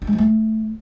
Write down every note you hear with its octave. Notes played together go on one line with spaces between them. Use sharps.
D4
G#3
F3
A3